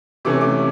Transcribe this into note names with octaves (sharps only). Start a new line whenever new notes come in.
C3 E3 A3 C#4 D6
D6